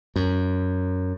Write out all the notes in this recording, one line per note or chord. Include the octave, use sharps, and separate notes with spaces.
F#2